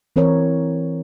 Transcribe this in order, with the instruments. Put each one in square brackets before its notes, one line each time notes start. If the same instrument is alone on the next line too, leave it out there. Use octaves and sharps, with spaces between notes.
[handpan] E3 C4 A#4 C#5